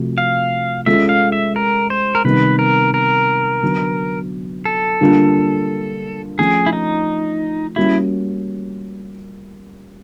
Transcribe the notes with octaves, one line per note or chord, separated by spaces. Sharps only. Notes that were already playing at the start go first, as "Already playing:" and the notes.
Already playing: C3 F3 A3 F#4
F5
G#3 C#4 F4 A4 E5
F5
E5
A#4
C5
A#4
C3 D#3 G3 B3 B4
A#4
A#4
D3 F#3 B3
A4
D3 G3 A#3 D4 F4
F3 A3 C#4 G#4
E4
D#4
G3 A#3 C#4 E4 F#4